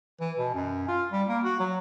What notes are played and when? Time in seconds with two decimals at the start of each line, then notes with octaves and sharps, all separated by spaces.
0.20 E3
0.39 B2
0.54 F#2
0.88 F4
1.12 G3
1.28 A#3
1.44 F#4
1.59 F#3